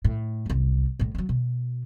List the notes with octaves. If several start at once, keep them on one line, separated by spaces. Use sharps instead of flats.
A2
F#1 C2
A#1 A2
F#3 G3
B2